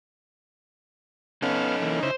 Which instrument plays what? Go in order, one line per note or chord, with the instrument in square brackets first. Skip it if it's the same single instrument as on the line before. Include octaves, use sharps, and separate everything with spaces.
[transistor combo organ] B3 F5 [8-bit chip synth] C#4 [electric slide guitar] D#4 A4
[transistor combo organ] E3 A#3
[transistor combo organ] C#3 D#4 E4 [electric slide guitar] C5